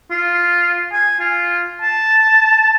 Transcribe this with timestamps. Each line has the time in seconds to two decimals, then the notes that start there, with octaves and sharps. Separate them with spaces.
0.11 F4
0.92 G#5
1.20 F4
1.82 A5